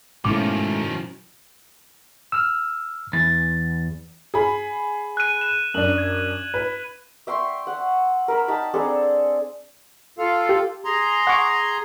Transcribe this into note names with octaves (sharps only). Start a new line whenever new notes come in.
G#2 B2 D#3 F3 A3 C#4 E4 D6
E6 F6
E2 A6
G#4 B5
F#6 D#7
E7
F#2 D4 F#7
G#6
B4
E5 G5 C6 C#6
F#5
A#4 B5 E6
D#4 G5 A5 B5
C4 D4 G#4 A4
F4 A4 F5
G4
G#4 A#5 C6
F#5 C#6 D6